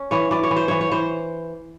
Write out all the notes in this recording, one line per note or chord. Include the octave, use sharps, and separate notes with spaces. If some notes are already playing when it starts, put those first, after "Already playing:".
Already playing: C#4
E3 C#5
E3 D5
C#5
E3
C5
E3 C#5
C#5
E3 C5